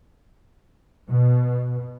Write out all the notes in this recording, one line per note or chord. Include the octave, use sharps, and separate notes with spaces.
B2